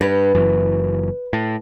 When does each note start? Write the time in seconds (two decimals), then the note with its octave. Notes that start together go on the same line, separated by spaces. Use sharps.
0.01 G2 B4
0.35 F#1 F#2 E3
1.33 A2